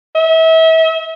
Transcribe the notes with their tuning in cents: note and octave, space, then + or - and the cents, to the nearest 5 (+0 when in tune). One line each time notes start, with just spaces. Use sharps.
E5 -35